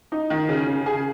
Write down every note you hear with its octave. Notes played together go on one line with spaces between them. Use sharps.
D#4
D#3
C#3
C#3
G#4